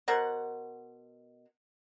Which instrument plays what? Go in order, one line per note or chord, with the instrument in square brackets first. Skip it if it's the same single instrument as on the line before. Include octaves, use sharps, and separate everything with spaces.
[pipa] B2 A#4 C5 F#5